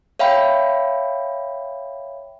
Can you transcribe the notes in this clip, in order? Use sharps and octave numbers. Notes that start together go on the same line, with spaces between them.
C#5 E5 F5 G5 B5